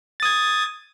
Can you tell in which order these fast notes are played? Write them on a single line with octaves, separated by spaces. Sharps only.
A6 D#6 G#6